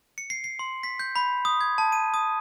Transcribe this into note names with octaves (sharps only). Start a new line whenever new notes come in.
C#7
C7
C7
C6
B6
G6
B5
D#6
G#6
A5
D#7
D#6